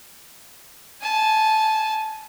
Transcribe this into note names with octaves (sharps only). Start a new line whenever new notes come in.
G#5 A5